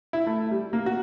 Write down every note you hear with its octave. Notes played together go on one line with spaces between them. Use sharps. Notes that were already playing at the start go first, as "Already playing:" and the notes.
E4
A3
G3
A#3
F#4